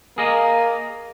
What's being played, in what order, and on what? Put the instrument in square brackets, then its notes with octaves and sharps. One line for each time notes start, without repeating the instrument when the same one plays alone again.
[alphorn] A#3 [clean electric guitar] G#4 A#4 D#5